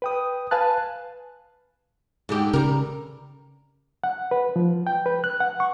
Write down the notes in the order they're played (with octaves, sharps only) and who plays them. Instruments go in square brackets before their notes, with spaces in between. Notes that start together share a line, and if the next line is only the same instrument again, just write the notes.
[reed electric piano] B4 G5 D#6
B4 F5 G#5 A5 F#6
[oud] G#2 D3 G4
[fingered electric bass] C#3 [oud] G3 A#4
[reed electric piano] F#5
B4
F3
G5
B4
F#6
F#5
C#6